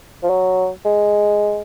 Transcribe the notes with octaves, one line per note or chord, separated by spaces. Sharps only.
F3
F#3
G#3